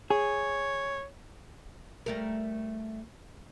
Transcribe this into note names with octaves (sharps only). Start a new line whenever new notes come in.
G#4 C#5
G3 A3 A#4